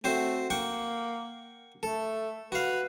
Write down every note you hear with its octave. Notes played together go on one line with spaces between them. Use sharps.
A3 C4 F#4 C5
A#3 F#5 G5 C#6
A3 A4
F#4 B4 F5